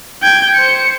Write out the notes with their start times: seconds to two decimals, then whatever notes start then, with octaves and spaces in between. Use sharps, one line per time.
0.23 G5 G#6
0.55 C5 C#7